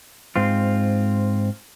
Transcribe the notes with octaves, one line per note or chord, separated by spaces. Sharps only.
G#2 C4 F4